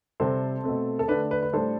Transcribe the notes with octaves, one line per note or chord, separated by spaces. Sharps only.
C3 G3 C4 A4 C5
B2 A3 C4
A4
D3 A3 D4 B4
B4
B4
A2 G3 D4 A4 C5